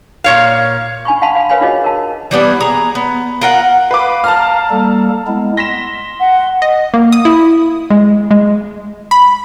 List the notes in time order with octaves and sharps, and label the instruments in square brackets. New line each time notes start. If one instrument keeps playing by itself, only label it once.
[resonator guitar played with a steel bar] A#2 C#5 F5
[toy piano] D4 G#5 B5 C#6
F5 F#5 A5 B5 C6
F5 B5
A#4 B4 C#5 F5 G#5 B5
D4 F4 F#4 G#4 C#5 D#5
A#4 A5
[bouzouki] E3 G3 B3 D4
G#4 A#5
B3
F4 A#4 F#5
[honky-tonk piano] B4 D6 [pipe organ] F5
[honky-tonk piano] A5 A#5 F6
[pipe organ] G3 A#3 A4
G#3 B3 E4
[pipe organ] C6 [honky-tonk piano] A#6 B6 E7
[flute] F#5
[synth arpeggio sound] D#5
A#3
D#6
E4
G#3
G#3
B5